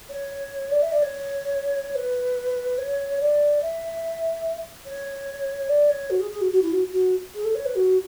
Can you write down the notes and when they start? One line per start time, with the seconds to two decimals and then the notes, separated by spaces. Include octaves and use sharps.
0.10 C#5
0.71 D5
0.82 E5
0.92 D5
1.02 C#5
1.95 B4
2.78 C#5
3.21 D5
3.62 E5
4.86 C#5
5.69 D5
5.90 C#5
6.10 F#4
6.20 G#4
6.31 G#4
6.41 F#4
6.52 F#4
6.62 E4
6.72 F#4
6.93 F#4
7.35 G#4
7.44 A4
7.55 C#5
7.66 B4
7.76 F#4